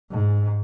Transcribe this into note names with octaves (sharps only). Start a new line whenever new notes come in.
G#2